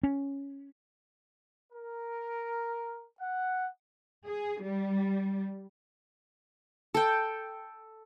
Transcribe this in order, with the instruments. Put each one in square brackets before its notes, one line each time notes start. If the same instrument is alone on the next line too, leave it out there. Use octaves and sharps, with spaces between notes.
[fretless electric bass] C#4
[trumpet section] A#4
F#5
[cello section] G#4
G3
[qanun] A4 G5